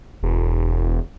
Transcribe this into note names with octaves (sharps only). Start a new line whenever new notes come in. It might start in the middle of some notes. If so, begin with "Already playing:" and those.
E1